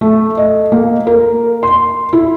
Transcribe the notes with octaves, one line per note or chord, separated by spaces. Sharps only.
A3
D#5
A#3
A#4
C6
E4